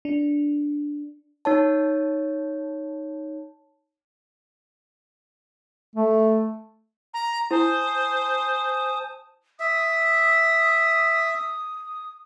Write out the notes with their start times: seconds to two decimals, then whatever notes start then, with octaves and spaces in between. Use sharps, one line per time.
0.05 D4
1.45 D#4 C#5 A5
5.96 A3
7.14 A#5
7.51 E4 C5 G#5 A5 D#6
9.60 E5 D#6